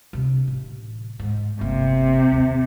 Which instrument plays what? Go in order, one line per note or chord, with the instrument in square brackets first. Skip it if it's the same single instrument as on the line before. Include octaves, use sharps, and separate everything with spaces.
[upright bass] C3 D4
A1
G#2
[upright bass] G1 A#3 [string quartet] C3
[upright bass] D#2 C4